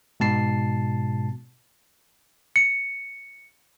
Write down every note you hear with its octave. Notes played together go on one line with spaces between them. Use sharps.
G#2 B2 A5 C7
C#7